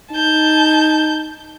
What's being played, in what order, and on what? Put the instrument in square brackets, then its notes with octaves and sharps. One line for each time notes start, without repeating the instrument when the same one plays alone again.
[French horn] D#4 [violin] A5 G6